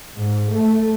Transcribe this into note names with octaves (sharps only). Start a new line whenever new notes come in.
G#2
A3